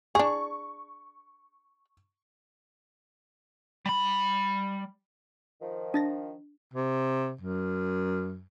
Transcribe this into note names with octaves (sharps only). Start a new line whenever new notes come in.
D4 G#4 C#6
G3 B5
D#3 F3
D4 A6 A#6
C3
F#2